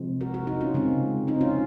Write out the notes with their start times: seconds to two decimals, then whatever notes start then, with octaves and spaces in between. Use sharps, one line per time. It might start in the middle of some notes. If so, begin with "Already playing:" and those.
Already playing: C3 F3 G#3 C4
0.21 F#4 A#4
0.34 F#4 A#4
0.47 D#4 F#4
0.61 C#4 F4
0.74 C#3 G#3 C4
1.28 C4 D#4
1.41 C#4 F4